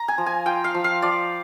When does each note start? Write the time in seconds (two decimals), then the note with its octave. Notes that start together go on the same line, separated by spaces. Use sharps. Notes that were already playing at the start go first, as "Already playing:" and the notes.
Already playing: A#5
0.08 G#5
0.18 F3
0.26 G#5
0.46 F4 G5
0.64 F5
0.74 F3
0.84 F5
1.02 F3 D5